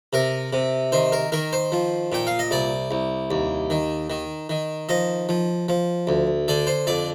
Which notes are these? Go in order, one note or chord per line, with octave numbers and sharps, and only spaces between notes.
C3 A#4
C3
D#3 C5
A#4
D#3 A#4
C5
F3
A#2 G5
F5
D#5
C2 D5
C2
D#2
D#3
D#3
D#3
F3 D#5
F3
F3
D2
D3 D5
C5
F2 D5